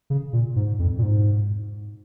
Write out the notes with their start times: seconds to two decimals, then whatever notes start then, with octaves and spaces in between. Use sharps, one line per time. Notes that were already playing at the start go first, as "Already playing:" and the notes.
0.10 C#3
0.33 A#2
0.56 G#2
0.79 F2
0.99 A#2
1.03 G#2